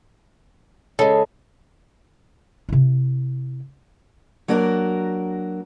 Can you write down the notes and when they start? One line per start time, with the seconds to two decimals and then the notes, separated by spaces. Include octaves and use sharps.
0.99 C#3 G#3 A4
2.69 C3 E4
4.48 F#3 A#3 D4 F#4 A#4